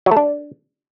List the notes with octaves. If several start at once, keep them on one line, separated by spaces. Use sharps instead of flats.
F#3
A3
D4